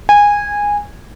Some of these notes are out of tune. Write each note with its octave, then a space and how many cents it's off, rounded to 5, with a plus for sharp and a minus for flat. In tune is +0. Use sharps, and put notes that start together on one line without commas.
G#5 -15